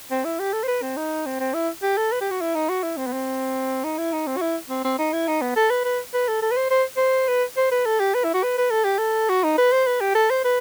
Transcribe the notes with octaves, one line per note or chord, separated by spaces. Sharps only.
C4
E4
G4
A4
C5
B4
C4
D#4
C4
C4
E4
G4
A4
B4
G4
F#4
E4
D#4
F#4
E4
C4
B3
C4
D#4
E4
D#4
C4
F#4
E4
C4
C4
D#4
E4
D#4
B3
A4
B4
B4
B4
A4
A4
B4
C5
C5
C5
B4
C5
B4
A4
G4
B4
E4
F#4
B4
B4
A4
G4
A4
F#4
D#4
B4
C5
B4
G4
A4
C5
B4